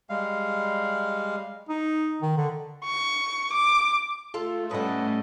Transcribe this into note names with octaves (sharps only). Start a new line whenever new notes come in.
G3 G#3 F5
D#4
D#3
D3
C#6
D6
A3 F4 A4
A2 G3 C#4 A4 B4 D#5 F#5